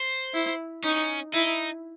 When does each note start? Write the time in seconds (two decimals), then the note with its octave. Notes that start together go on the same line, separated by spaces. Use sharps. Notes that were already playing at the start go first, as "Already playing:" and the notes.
Already playing: C5
0.34 E4
0.84 C#4 D#4
1.34 D#4 E4